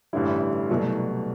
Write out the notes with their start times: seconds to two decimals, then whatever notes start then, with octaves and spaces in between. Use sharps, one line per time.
0.13 A1 G2 D3 G3 E4
0.70 C2 B2 F#3 A3